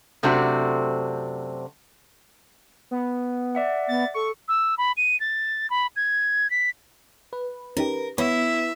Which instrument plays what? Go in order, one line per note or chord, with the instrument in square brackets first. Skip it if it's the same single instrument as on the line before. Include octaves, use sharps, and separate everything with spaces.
[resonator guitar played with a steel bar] F#2 C3 A3 C4 D4 F#4
[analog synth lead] B3
[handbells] D5 E5 F#5
[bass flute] B3 [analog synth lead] A6
[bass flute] A4 [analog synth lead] C#6
[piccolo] E6
B5
D#7
A6
B5
G#6
B6
[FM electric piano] B4
[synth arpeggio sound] C#4 D#4 G4 [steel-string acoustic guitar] A#4
[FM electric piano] B3 B6 [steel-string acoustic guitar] E4 [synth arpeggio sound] B4 C#5 [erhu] E5